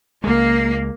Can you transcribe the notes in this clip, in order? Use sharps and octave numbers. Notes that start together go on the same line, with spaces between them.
C#2 G#3 A#3